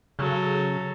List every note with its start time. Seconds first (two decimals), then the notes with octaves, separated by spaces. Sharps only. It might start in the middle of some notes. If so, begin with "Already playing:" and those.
0.19 C#3 F#3 A4